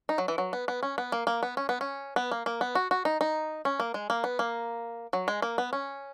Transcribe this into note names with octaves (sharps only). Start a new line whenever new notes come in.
D#4
F#3
E3
F#3
B3
B3
C#4
B3
A#3
A#3
B3
C#4
B3
C#4
B3
A#3
A#3
B3
F#4
F#4
D#4
D#4
C#4
A#3
G#3
A#3
B3
A#3
F#3
G#3
A#3
B3
C#4